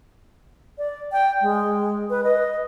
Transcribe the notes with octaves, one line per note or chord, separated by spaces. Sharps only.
D5
G5
G#3
B4
D#5